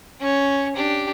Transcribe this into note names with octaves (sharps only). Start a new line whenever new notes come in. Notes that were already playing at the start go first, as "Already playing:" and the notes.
C#4 C#5
D4 G4